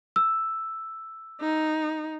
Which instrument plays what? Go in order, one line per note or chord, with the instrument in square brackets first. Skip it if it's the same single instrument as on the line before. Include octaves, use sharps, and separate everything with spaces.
[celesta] E6
[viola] D#4